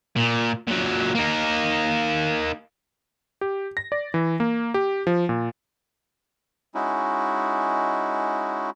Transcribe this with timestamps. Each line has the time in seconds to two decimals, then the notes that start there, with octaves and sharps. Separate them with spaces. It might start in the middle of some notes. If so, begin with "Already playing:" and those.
0.16 A#2
0.67 A#2 F#3
1.15 A#3 D#4
3.41 G4
3.77 A#6
3.92 D5
4.14 E3
4.40 A#3
4.74 G4
5.07 F3
5.29 A#2
6.75 G#3 C#4 D#4 E4 F#4